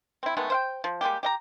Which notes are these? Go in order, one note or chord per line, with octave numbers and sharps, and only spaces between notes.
C4 E4
D#3 G#3 A3 B3
C5 F5 G5
F3
G3 G#3 A#3 G4
G4 D#5 A#5